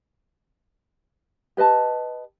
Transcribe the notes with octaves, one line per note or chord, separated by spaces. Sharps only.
G4 B4 D#5 A5